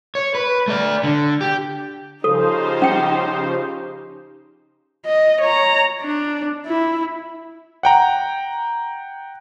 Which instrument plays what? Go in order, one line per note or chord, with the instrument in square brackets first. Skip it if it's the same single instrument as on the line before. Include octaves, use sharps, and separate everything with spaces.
[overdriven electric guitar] C#5
B4
A3 D5
D3
G4
[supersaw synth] C#3 F3 C5 [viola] D#4 G4 [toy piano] A4
[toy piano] C#4 G5
[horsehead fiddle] D#5
C#5 A#5
D4
E4
[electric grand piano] F#5 G5 A#5